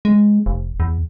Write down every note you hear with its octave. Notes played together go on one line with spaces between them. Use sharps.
G#3
F1
E2